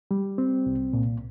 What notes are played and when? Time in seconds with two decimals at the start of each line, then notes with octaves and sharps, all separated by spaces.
0.11 G3
0.38 C4
0.66 C2
0.93 A#2